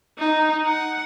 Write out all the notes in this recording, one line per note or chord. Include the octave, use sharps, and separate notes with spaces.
D#4
F#5